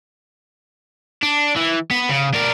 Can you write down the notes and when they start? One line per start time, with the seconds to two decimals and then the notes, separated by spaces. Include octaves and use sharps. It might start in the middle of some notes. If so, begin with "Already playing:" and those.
1.23 D4
1.56 E3
1.91 B3
2.09 C#3
2.34 D4 A#4